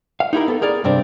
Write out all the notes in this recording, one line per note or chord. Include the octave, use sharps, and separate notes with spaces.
F5
D#4 E4 G4 A#4
B3 A4
G#4 A#4 D5
G2 C3 C4 D4